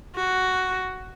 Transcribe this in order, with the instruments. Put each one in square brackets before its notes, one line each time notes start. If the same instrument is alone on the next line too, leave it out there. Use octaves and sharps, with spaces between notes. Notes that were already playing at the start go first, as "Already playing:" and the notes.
[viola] F#4